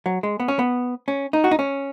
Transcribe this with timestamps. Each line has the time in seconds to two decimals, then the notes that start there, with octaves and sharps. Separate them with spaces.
0.06 F#3
0.23 G#3
0.40 B3
0.48 C#4
0.59 B3
1.08 C#4
1.33 D#4
1.44 F#4
1.51 D#4
1.59 C#4